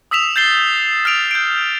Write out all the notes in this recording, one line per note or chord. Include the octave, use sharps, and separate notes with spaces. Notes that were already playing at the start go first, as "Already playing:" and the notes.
D#6 E6 B6 E7 F7
G6 A6 C7 G7
F6 A6 D7 F7
G6 D7